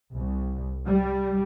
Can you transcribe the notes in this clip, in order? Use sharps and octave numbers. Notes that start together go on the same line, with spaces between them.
C2
G3